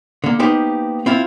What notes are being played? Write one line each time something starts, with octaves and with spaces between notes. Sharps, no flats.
D3 A#3
A#3 B3 D#4 G4 C5
C4 E4 F4